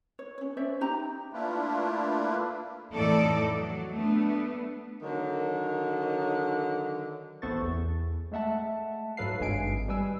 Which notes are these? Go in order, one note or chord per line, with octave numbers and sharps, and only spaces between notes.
C#5
C#4 C#5
C#4 C5 D5 E5
D#4 G4 A#5
A3 A#3 D4 E4 F4 B4
F2 A2 E3 D#4 A4 D5
F#3
A3 B3 D4
D3 D#3 F#3
A1 B3 A4 C5 C#6 A6
E2
G#3 A3 E5 F#5 A5
G#2 F#3 A4 B4 F5 C7
G#1 G2 G#3 G#5 C7 D7
G3 B4 G#5 E6